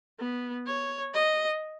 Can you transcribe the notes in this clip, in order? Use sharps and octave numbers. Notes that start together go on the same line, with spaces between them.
B3
C#5
D#5